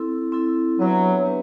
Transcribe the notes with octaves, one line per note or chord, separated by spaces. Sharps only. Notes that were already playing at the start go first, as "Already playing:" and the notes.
Already playing: C4 E4 A4
C4 E4 A4
F#3 B3 D4 G4 B4 E5
B3 D4 G4 B4